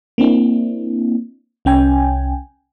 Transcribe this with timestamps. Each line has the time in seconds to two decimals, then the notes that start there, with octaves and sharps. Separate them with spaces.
0.18 A#3 C4 D4 E4
1.65 C2 C#4 G5 G#5